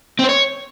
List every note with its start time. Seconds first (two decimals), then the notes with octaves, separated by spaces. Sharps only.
0.19 C4
0.24 C5
0.29 C#5